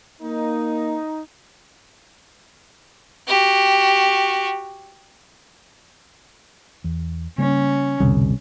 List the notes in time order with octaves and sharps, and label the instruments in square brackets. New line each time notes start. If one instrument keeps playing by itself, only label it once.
[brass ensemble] A#3 [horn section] D#4
[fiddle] F#4 G4
[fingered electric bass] E2
[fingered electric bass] C#3 G3 A#3 [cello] C#4
[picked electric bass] C2 [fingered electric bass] F2 B2 D3